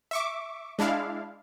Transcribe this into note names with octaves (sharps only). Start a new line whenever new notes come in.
E5 C#6 D6
G#3 D4 E4 F5